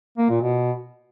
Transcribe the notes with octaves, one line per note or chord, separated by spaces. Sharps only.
A#3
A#2
B2